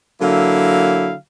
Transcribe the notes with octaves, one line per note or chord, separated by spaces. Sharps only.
D3 F#3 A#3 E4 F5